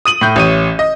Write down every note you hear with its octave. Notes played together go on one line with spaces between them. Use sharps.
D#6 D#7 F#7
A2 G6
A1 C#5 D#7
D#5